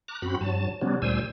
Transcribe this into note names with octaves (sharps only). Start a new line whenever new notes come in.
A#5 D6 F#6
F#2 C4 F#4 B5
G2 F#3 A5
C3 F#3 G3 B3 C#4 D4
D2 A#2 G3 C5 G#5 E6